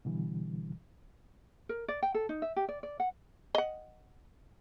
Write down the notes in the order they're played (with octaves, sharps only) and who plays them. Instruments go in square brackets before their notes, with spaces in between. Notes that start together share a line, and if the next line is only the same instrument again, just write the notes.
[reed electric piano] B2 D3 E3 G3
[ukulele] A#4
D5
G5
A4
D#4
E5
G4
D5
D5
F#5
[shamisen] D#5 F#5